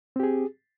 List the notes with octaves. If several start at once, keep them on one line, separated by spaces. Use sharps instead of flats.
C4 G4 G#4